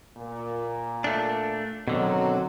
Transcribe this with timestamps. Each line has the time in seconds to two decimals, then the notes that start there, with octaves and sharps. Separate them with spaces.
0.16 A#2
1.04 A3 D4
1.88 B2 D3 D#3 F#3 C4